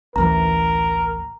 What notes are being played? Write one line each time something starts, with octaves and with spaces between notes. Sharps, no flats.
A1 D2 E3 A#4 A#5